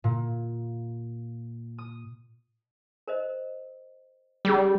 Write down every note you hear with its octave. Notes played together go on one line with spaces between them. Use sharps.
A#2
D#6
A#4 C5 D#5
G3 C#4 G#4 D6